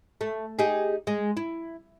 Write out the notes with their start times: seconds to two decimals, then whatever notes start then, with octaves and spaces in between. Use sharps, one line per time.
0.21 A3
0.59 D#4 G4 G#4
1.07 G#3
1.37 E4